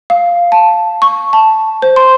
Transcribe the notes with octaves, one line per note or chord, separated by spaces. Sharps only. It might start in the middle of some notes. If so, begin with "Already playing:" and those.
F5
A5
C#6
A5
C5
C6